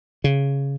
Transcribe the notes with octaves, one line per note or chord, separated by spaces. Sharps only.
C#3